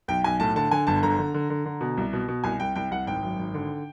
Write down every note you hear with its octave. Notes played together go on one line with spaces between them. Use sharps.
B1 G5
B1 G#5
A2 A5
D3 A5
D3 G#5
G1 A5
D3 A#5
D3
D3
D3
D3
B2
C2
B2
B2
C2 G#5
C2 G5
C2 G5
C2 F#5
G#1 G5
F#2
G#1
D3